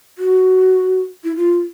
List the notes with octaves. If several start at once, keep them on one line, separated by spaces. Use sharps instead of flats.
F#4
E4
F4